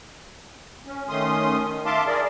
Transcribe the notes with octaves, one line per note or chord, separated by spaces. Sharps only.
C#4
D#3 A3 C#4 C6 D#6
D#3
E5 F5 A5 C6 D6
G#4 A#4 D5